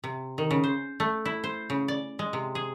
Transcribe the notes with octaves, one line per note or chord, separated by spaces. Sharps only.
C3
D#3
C#3
C5
A3
E4
C5
C#3
D5
G#3
C3
G#4